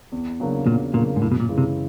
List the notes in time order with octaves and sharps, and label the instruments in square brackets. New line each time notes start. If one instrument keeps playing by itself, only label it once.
[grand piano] E2
C#3 F#3 A#3 D4
[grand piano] E2 [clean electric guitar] A#2
[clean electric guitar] A#2 [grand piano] C#3 F#3 A#3 D4
[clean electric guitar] G#2
[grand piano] F#2 [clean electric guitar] A2
[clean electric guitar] B2
A#2
[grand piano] C#3 E3 G#3
[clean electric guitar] C3